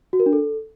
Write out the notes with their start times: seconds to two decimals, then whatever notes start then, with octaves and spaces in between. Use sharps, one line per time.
0.13 F#4
0.20 A#4
0.26 D4
0.33 A4